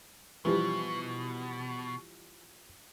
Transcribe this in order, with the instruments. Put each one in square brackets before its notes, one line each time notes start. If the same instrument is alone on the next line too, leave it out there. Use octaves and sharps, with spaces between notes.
[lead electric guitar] B2 [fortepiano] E3 F3 G3